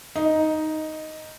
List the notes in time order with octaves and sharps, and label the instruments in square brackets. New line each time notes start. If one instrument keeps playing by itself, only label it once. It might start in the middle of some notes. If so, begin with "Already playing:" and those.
[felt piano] D#4